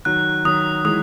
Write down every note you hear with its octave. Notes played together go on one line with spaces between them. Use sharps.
D#3 F#3 F#6
D#3 F#3 D#6
E3 G#3 D#6